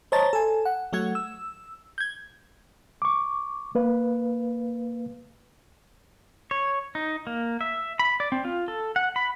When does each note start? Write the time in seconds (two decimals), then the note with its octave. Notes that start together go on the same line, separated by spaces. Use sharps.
0.12 C5 C#5 D#5 A5 A#5 A6
0.33 A4 G#5
0.65 F#5
0.93 F#3 A3 F#4 F#5 G#6
1.15 E6
1.98 G6 G#6
3.02 C#6 D6
3.75 A#3 B4 F5
6.51 C#5
6.95 D#4
7.27 A#3
7.61 E5
7.99 B5
8.20 D5
8.32 C4
8.45 F4
8.68 A4
8.96 F#5
9.16 B5